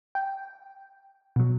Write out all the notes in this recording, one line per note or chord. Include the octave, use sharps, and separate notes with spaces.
G5
B2 F#3